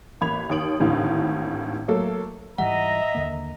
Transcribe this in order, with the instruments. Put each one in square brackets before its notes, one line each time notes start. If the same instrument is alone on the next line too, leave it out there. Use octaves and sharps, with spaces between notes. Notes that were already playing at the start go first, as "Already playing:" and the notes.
[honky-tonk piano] A1 A#3 B5 G#6 F7
D#2 C#5 D#6 D7 F#7
G#1 D#2 A2 D3 E3
F#3 A3 A#3 A4
[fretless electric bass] G#2 E3 G3 [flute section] D#5 [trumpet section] E5 A#5 [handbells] F#5
[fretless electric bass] D#2 D3 A#3